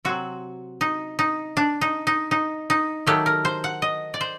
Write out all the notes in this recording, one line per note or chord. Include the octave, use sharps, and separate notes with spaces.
C3 F#3 C4 F#4
D#4
D#4
D4
D#4
D#4
D#4
D#4
D#3 F#3 A3 G4
A#4
C5
F#5
D#5
D5
C5